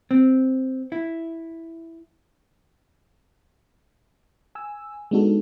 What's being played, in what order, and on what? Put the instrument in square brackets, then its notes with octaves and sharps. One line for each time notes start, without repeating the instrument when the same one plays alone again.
[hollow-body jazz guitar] C4
E4
[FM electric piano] G#5 E6
G#3 B3 D4 D#4 F#4 A4